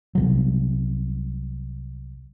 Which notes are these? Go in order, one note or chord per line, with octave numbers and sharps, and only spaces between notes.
C2 C3 F#3